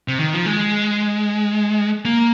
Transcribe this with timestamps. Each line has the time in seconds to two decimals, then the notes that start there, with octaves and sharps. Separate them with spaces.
0.08 C3
0.20 D#3
0.33 F3
0.46 G#3
2.05 A#3